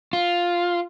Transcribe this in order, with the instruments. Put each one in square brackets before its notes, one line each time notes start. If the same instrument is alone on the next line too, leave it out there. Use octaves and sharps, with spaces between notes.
[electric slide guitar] F4